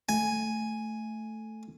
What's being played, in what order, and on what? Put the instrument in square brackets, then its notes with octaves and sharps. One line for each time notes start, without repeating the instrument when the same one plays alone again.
[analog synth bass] A3 [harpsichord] G#5